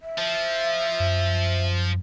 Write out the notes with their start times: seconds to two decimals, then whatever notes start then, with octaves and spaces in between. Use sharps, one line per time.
0.01 E5
0.18 F3
1.00 F#2